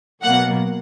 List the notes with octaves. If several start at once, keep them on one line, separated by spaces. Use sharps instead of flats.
B2 F#3 A#3 F#5